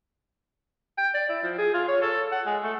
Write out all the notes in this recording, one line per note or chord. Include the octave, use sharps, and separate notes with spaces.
G5
D5
E4
F3
G#4
F4
C#5
A4
F#5
G#3
A3